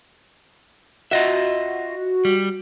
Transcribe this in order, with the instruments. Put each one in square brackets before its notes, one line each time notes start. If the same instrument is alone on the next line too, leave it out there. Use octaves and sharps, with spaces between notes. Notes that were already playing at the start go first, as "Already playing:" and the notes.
[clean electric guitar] F4 D#5 E5 [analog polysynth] F#4
[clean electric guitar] G3